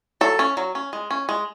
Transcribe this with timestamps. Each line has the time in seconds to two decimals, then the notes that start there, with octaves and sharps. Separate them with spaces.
0.21 F#3 A4
0.39 C#4
0.57 F#3
0.75 C#4
0.93 G#3
1.11 C#4
1.29 G#3